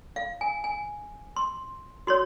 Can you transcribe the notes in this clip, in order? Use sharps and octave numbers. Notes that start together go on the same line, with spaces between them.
F5
G#5
G#5
C6
F#4 C#5 C6